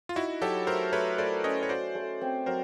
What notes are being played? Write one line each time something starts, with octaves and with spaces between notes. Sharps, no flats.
F4
D#4 E4 F#4
F#3 G4 A4
A3 A#4 C5
A3 B4 C#5
A3 C5 D5
C#4 C#5 D#5
C#5
F#4 C5 D5
A3
C4
F#3 A#4 C5